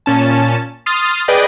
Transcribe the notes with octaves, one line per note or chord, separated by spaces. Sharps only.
A#2 C#4 A5
C6 D#6 F6 A6
G#4 B4 D5 D#5 G5